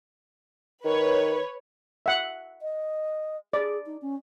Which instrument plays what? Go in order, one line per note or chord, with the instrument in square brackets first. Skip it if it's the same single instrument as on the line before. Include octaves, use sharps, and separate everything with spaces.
[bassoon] D#3 [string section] B4 C#5
[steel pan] E5 F#5
[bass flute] D#5
[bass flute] G#4 [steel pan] D5
[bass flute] D#4
C#4